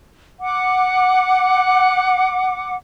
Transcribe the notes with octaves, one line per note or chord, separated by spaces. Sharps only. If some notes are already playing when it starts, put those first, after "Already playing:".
F#5 D6